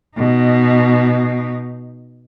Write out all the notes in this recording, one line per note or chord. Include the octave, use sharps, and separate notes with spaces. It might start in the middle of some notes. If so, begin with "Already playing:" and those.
B2 D#4